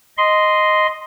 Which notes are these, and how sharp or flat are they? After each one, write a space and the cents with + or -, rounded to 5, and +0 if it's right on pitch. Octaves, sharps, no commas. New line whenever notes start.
D#5 +0 C6 -10